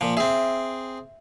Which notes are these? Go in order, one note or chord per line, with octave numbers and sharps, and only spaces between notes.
A#2 F3
C4 G#4 E5